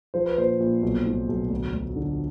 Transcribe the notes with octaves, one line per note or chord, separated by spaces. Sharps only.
F3 C5
B4
A#1 C5
A#1
B1
A2
B1
D2
D2
D3